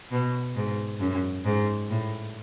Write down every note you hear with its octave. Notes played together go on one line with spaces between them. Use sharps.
B2
G#2
F#2
G#2
A2